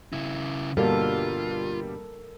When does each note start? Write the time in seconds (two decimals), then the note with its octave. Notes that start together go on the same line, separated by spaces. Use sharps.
0.13 C#3 E4
0.77 G2 B2 D3 G3 A#3 F4 A4 A#4